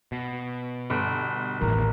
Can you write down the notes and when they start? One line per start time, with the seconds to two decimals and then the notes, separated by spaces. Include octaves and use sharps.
0.12 B2
0.90 G1
1.61 A1 E2 D#3 E3 A#4